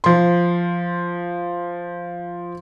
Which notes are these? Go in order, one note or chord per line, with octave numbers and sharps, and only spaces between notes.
F3 C6